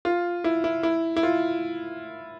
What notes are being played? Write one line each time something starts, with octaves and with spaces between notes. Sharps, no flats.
F4
E4
E4
E4
E4
F4